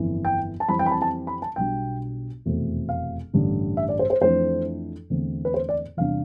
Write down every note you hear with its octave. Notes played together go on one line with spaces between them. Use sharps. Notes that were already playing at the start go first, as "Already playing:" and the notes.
Already playing: G1 F2 E3
G5
A5
F2 E3 G3 C4 B5
G5
B5
A5
A5
B5
A5
B1 B2 G3 D4 G5
F1 E2 B2 A3 C4
F5
A1 G2 D3
E5
D5
C5
C5
F2 E3 A3 D4 C5
E2 D3 A3 C4
B4
C5
D5
E2 C3 G3 D4 F5